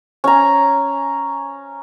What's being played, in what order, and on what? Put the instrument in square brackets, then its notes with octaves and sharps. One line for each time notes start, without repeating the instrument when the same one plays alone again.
[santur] C#4 G#5 A#5